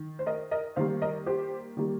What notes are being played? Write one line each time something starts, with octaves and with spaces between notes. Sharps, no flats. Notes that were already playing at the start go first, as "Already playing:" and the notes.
Already playing: D#3
C5
A#4 D#5
A#4 D#5
D#3 G3 A#3 C5 F5
A#4 D#5
G4 C5
D#3 G3 A#3